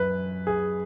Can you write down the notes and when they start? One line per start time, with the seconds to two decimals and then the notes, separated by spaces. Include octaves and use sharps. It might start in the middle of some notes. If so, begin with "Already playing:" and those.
Already playing: F#2 B4
0.47 G#4